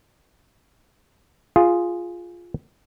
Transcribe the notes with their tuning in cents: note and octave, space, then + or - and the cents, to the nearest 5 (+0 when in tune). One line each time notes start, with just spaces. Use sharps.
F4 +0 G#4 +0